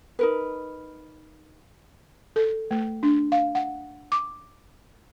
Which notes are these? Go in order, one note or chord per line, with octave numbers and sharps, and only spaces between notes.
D#4 A#4 B4
A4
A3
D4
F5
F#5
D6